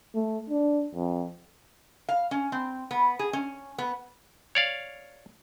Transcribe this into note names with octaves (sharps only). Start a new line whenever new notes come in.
A3
D4
F2
F5
C#4
C4
B3
G#4
C#4
B3
C#5 D5 F5